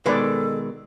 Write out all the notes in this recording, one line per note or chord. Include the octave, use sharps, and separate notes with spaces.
B2 D#3 G#3 A4 B4 D5